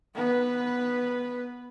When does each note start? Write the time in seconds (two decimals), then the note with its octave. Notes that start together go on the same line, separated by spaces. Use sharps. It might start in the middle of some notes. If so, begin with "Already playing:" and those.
0.15 B3 B4